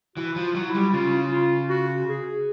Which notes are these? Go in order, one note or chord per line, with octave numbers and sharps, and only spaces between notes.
E3 F#4
F3
F4
F#3
E4
G3
C#3 F4
F4
F#4
G#4